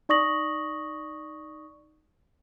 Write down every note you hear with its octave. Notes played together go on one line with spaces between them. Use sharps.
D#4 D5 C#6 D#6 A#6 F#7